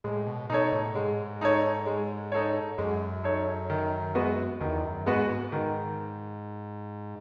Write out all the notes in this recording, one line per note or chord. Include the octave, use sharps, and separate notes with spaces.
A2 G#3
B2
B2 D#4 A4 C#5
A2
G#2 G#3
D#4 A4 C#5
G#3
D#4 A4 C#5
F#2 G#3
D#4 A4 C#5
D#3
G#3 B3 F#4 B4
E2 D#3
F#2
G#2 G#3 B3 F#4 B4
G#2
D#3